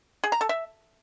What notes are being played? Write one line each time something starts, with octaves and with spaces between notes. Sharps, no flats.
G#4
A#5
A4
E5